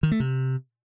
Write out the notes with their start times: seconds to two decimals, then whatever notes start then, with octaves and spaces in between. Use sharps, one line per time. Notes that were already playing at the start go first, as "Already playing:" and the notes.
0.03 D#3
0.12 A3
0.20 C3